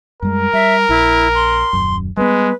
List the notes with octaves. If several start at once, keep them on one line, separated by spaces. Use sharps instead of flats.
F#2 G3 G#3 A#4
G3 E5
A#1 E4
C6
D#1 F#2
G3 G#3 A#3 B3 B4